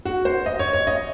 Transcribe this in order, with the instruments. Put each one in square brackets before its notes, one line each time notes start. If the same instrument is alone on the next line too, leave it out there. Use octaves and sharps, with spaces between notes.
[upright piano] F#4
C5
D#5
C#5
C#5
D#5